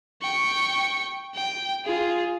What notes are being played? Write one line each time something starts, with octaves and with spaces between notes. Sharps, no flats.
G5 C#6
G5
F4 G#4